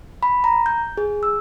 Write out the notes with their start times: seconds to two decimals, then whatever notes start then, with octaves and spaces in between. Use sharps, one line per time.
0.23 B5
0.44 A#5
0.66 G6
0.97 G#4
1.23 E6